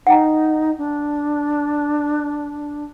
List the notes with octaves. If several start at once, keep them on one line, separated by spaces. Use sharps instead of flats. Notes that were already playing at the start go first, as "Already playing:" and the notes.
D#4 F#5 G5 A#5
D4